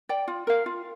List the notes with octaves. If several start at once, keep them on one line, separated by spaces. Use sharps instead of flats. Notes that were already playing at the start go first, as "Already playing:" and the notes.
D5 G5
F4
A#4 F5
F4